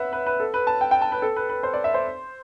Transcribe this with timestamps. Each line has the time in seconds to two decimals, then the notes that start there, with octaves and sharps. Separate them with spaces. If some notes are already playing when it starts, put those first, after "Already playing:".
Already playing: B4 E5 F#5
0.13 B4
0.26 B4
0.40 A4
0.54 B4
0.67 A5
0.81 G5
0.91 G5
1.01 A5
1.12 B4
1.22 A4
1.36 B4
1.49 B4
1.63 C5
1.73 D5
1.84 E5
1.94 C5